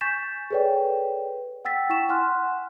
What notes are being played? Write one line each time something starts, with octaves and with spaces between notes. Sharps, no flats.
G#5 C#6 G6 A6 B6 E7
G#4 A4 B4 C#5 D5 G5
F#5 G5 E6 A6 B6
E4 G5 C#6 B6 E7
F#5 G#5 C6 F6 F#6